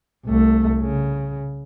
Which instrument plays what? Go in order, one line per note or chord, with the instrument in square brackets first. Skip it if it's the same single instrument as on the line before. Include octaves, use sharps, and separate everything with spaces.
[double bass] C2 A3
C#3